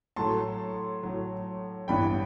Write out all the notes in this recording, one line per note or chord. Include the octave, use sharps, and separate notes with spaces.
A2 F#3 A3 A5 C6
A2 F#3 A3
A1 G2 E3 B3 E4 G5 B5